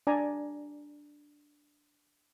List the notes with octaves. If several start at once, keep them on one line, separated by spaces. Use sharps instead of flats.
D4 D5 G#5 A#5